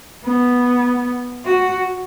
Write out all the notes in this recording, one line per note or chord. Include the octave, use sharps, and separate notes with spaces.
B3
F#4